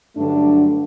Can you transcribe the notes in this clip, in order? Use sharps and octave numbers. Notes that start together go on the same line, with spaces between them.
G2 D3 F#3 A3 D4